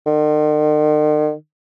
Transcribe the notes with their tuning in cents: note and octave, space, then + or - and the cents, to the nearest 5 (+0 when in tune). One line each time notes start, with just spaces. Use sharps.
D#3 -45